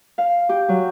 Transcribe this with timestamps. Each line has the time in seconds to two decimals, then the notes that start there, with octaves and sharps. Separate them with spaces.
0.18 F5
0.49 G4
0.69 F#3